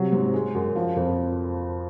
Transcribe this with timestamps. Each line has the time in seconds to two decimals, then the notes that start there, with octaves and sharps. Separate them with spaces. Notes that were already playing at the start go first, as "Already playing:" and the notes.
Already playing: C3 F#3
0.13 G#2
0.34 G#3
0.55 F#2
0.76 F3
0.97 F2